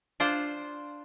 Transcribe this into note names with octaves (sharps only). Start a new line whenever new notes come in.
D4 F4 C5